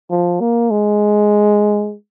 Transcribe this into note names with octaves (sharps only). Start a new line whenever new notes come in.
F3
A#3
G#3